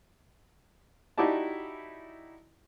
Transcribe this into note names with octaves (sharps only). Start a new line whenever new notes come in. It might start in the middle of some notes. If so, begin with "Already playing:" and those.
D#4 E4 F#4 G4 D5 A5